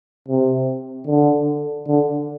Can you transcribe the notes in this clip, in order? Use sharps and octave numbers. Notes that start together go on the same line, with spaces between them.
C3
D3
D3